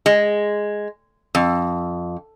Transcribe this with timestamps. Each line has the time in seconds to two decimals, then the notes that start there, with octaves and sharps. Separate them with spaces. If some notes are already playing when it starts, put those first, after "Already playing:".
0.06 G#3
1.35 F2